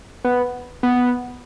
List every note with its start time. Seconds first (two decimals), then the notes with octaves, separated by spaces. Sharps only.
0.24 B3
0.83 B3